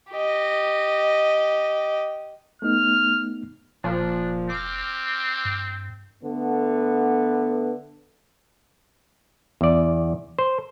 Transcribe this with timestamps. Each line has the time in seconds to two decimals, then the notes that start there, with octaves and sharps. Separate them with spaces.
0.12 G4 D#5
2.62 A3 B3 D#4 F6
3.84 F1 A#2 F3 D4
4.50 C4 D6 F6
5.45 G2
6.24 D3 A3 B3
9.61 E2 D5
10.39 C5